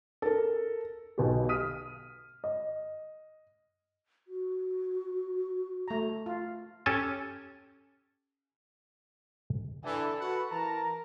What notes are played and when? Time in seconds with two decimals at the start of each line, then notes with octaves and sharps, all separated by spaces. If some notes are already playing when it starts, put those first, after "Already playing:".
0.22 A4 A#4
1.18 B1 B2 G4
1.49 D#6 F6 B6 D#7
2.44 D#5
4.28 F#4
5.88 A3 A#5
6.26 F4
6.86 C#4 G4 A4 G#5 A5
9.84 D3 E3 A4
10.20 F#4 B4 F#5
10.50 E3 A#4 A5 A#5